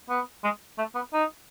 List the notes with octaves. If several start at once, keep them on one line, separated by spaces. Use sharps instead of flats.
B3
G#3
A3
B3
D#4